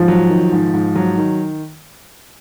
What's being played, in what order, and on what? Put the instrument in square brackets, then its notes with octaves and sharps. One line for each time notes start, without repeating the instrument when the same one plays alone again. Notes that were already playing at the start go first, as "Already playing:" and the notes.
Already playing: [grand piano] G#2 [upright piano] F3
[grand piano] F#3
D#3
G#2
G#2
F#3
D#3